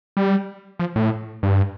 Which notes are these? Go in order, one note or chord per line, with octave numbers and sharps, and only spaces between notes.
G3
F3
A2
G2